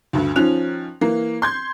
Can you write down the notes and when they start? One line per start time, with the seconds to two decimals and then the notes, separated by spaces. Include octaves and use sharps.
0.13 D2 G2 D3
0.36 D#3 F3 C#4 F#6 F7
1.01 E3 A#3
1.42 C6 G6 G#6